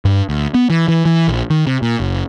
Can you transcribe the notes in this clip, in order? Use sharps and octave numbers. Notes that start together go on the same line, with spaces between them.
G2
D2
B3
E3
E3
E3
A#1
D#3
C3
A#2
F#1